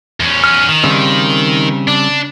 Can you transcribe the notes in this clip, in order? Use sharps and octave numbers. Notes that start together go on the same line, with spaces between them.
E2 C#4
F6
D#3
C#3 G3 C4
D4